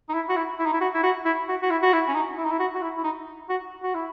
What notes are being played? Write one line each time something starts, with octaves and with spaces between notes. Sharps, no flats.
D#4
E4
F#4
E4
E4
D#4
E4
F#4
E4
F#4
E4
F#4
F#4
E4
F#4
E4
C#4
D#4
E4
D#4
E4
F#4
F#4
E4
E4
D#4
F#4
F#4
E4